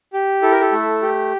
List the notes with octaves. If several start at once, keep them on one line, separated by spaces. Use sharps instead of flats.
G4
E4 A4
A#4
A4
A3
G4